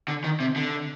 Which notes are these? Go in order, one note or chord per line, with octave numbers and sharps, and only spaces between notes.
D3
D#3
C3
D3